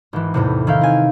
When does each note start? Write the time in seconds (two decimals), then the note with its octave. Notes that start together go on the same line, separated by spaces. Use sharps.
0.13 G#1 E3
0.34 E2 A2 C3
0.67 D#3 E4 F5 G6
0.81 C4 G#5